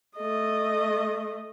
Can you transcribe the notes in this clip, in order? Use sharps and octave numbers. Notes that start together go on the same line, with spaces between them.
A3 D#5